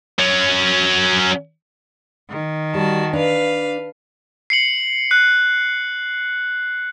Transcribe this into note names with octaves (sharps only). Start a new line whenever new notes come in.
F#3 C#4
D#3
G3 F#4 A5
D4 B4 F5
C7 C#7 F#7
F#6 C7